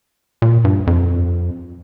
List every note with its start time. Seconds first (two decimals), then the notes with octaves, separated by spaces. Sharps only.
0.42 A#2
0.65 G2
0.87 F2